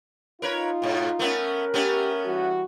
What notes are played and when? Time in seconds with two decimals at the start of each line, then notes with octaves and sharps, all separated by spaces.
0.42 D#4 F4 A#4 B4 C#5
0.82 G#2 B2
1.19 A3 B3 C#4 A#4
1.74 A3 B3 C#4 G4
2.26 E3 G3 F#4